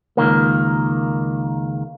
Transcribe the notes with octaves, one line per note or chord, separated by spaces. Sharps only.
C#2 D#3 A#3